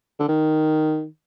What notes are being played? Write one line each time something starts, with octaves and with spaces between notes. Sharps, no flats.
D3
D#3